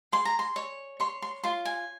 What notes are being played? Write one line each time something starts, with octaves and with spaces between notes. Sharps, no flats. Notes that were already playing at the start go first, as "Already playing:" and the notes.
G#4 C6
A#5
C6
C#5
C#5 C6
C6
F4 C6
G#5